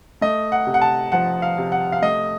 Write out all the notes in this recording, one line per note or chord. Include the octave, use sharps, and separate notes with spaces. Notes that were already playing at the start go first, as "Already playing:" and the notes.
A3 D#5
F#5
C3
F#5
A5
F3 F#5
F5
C3
F#5
F5
A3 D#5